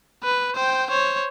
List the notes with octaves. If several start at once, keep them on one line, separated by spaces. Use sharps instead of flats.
B4
C5 G5
C5 C#5